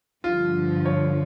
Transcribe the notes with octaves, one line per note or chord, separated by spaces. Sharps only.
G2 D3 F3 F4
C#5